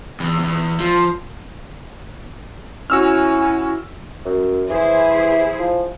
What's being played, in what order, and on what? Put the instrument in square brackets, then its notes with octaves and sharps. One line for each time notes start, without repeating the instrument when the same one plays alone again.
[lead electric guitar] E2
E2
F3
[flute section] C#4 G#5 [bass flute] E4 [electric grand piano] F#4 E6 F6
[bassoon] F#2
[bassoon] E3 [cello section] E4 G#4 C5
[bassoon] F3